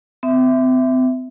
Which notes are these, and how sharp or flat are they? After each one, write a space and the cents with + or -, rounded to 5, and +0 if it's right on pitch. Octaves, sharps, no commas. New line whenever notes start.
C4 -40 E5 +0